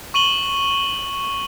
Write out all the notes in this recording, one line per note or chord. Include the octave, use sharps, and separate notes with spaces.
C#6 D#7 F#7 G7